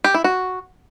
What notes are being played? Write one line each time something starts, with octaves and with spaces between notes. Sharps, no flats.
G4
E4
F#4